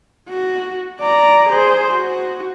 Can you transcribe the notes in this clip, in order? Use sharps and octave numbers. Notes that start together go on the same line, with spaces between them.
F#4
D5 A#5
G#4 C5
F#4